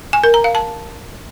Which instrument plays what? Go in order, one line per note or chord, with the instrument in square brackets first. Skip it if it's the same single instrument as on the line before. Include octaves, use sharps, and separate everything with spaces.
[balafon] G#5
A#4
A#5
F5
A5